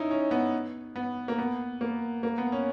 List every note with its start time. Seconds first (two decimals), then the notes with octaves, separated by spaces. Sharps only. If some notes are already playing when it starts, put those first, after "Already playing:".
Already playing: C#4 D#4 E4
0.11 C#4
0.31 B3
0.96 B3
1.28 A#3
1.38 B3
1.81 A#3
2.23 A#3
2.38 B3
2.52 C#4